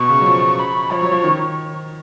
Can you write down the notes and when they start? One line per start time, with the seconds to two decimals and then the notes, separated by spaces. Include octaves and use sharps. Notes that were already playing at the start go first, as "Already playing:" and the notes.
Already playing: B2 C#6
0.09 C#3
0.21 F#3
0.26 F3
0.59 B5
0.91 F3 C#5
1.02 F#3
1.11 F3
1.24 D#3